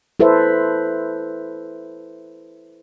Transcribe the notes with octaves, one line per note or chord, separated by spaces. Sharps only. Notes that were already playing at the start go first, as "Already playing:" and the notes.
E4 A4 B4 C5 E5